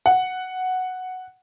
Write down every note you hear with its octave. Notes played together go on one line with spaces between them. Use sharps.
F#5